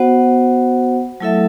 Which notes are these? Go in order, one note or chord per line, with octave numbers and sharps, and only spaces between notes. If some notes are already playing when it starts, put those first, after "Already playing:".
Already playing: B3 F#4 C5 F#5
F#3 A3 E4 A4 E5